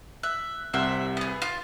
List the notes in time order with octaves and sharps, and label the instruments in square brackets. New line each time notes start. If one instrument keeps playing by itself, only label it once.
[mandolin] E5 [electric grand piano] F#6
[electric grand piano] C2 C3 F6 [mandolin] C5 E5 F#5
[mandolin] B3 G#4
F4